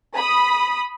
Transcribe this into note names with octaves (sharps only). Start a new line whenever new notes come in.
B5 D#6